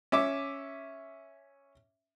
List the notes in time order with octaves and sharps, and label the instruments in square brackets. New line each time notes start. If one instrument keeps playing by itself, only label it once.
[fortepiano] C#4 E5 D6